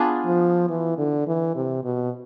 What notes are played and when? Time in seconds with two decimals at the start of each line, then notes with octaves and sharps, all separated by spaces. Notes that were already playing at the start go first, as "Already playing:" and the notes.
Already playing: B3 D4 F4 G#4
0.25 F3
0.69 E3
0.98 D3
1.27 E3
1.55 C3
1.84 B2